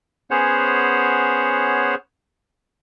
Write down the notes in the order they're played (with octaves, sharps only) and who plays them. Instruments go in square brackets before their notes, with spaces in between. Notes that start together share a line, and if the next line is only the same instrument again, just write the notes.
[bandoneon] B3 C#4 G#4 C5 C#5 F#5